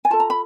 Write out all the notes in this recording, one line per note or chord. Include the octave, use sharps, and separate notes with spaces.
G#5
F4 A4 A5
A#5
B5